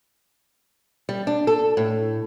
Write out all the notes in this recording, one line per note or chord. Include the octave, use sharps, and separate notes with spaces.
G3
D4
A4
A2